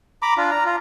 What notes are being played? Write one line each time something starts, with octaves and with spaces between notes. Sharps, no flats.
A#5 B5 D6
D4 F4
A#5
F4